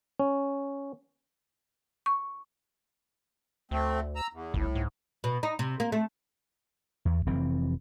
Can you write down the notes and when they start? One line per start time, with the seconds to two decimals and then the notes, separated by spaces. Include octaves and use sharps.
0.20 C#4
2.06 C#6
3.71 D2 A3 C4
4.16 A#5 E6
4.33 E2
4.54 G1 C2 A2
4.75 G#2
5.24 B2
5.43 D#4
5.59 C3
5.80 A#3
5.92 A3
7.05 E2
7.26 F1 E3 C4